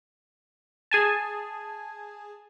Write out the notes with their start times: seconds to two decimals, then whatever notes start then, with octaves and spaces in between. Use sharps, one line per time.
0.91 G#4 G#5 A5